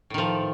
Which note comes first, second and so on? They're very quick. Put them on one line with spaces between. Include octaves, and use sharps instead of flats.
A2 D#3 F3